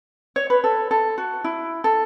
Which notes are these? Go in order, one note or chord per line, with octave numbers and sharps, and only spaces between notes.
C#5
B4
A4
A4
F#4
E4
A4